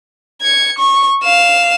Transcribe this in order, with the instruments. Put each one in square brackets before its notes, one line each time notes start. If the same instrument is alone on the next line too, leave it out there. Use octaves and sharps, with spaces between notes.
[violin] G#6 C#7
C#6
F5 E7